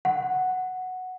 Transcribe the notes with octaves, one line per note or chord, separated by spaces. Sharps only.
F#5